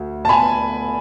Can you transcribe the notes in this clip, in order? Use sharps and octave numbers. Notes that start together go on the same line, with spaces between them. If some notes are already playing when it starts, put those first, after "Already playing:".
Already playing: D2
A5
G#5 B5